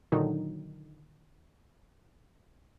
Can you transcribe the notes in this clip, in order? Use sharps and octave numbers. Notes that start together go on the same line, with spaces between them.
A#2 D3 D#3 F#3 D#4